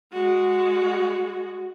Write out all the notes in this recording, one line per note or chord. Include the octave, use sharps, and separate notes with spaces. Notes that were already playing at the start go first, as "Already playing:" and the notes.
G#3 F#4